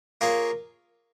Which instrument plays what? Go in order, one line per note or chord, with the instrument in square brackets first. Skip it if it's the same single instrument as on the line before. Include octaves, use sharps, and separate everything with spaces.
[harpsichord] A#3 F4 G#4 C#5